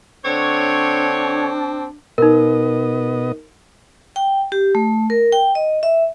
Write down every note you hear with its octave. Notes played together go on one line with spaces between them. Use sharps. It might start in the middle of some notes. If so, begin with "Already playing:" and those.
D3 C4 D4 C#5
B2 B3 D#4 A#4 D#5
G5
G4
A3
A#4
G5
D#5
E5